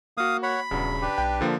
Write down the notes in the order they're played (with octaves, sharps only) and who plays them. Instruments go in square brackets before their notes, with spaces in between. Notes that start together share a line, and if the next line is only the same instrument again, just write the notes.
[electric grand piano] A#3 F#4 [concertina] F5 D#6
[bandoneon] C#5 F#5 [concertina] B5
[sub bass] D#1 [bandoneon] E2 F#3 [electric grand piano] G2 C#3
[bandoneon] D4 G4 B4
[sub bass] B1 [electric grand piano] G5
[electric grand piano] D3 F3 A#3